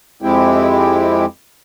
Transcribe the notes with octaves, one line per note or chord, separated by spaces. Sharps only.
F2 G#3 C4 E4 G4